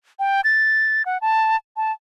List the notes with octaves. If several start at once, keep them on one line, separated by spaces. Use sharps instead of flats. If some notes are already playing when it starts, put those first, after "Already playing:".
G5
A6
F#5
A5
A5